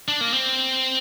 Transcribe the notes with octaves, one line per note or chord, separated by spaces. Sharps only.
D4
A#3
C4